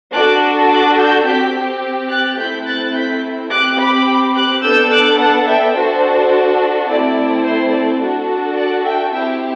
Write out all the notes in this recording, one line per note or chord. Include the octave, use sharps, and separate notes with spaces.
D4 F#4 A4 D6 F#6
D6 F#6
E6 G6
C4 G4 G6 B6
F#6 A6
A3 C4 E4 G6 B6
F#6 A6
G6 B6
C4 G4 D6 F#6
B5 D6
D6 F#6
B3 D4 A4 E6 G6
D6 F#6
F#5 A5
E5 G5
D4 F#4 A4 C5
A3 C4 E4 A4 D5
C5
D5
D4 F#4 A4
D5 F#5
E5 G5
C4 E4 G4 E5 G5